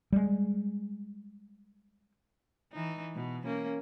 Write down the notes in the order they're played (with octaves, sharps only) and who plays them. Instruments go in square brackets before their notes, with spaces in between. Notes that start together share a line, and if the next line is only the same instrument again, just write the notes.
[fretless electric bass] G3 G#3
[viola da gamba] E3 D#4
B2
A#3 C#4